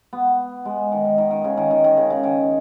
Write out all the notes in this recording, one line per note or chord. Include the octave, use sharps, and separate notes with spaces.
B3
G#3
D#3
D#3
D#3
D#3
C#3
D#3
D#3
D#3
C#3
C#3
D#3